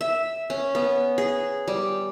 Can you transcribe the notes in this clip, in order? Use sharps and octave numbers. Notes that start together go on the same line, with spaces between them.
E5
C#4
B3
G#4
G3